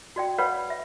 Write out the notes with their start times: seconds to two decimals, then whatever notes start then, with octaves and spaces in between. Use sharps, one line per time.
0.16 F#4 D5 G5
0.38 B4 C#5 D5 F5 F#5 B5
0.70 E5